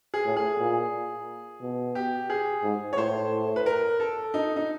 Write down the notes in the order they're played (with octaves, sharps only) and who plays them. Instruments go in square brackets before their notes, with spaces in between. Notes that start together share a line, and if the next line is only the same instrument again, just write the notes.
[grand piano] G#4
[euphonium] A2
[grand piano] G#4
[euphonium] A#2
B2
[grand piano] G4
G#4
[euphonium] G#2
[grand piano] C#5
[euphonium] A2 [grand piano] C5
[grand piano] B4
A#4
A4
D#4
D#4